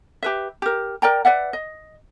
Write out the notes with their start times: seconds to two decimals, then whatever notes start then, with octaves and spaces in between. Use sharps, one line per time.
0.23 G4 B4 E5
0.62 G4 A#4
1.02 A#4 D5 G5 A#5
1.25 B4 D5 E5 F#5
1.53 D#5